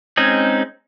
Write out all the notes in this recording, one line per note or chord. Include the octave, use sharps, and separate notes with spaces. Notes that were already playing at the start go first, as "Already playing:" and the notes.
G#3 C4 C#4 D#4 G#4